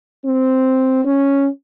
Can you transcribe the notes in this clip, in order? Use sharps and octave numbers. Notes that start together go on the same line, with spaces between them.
C4
C#4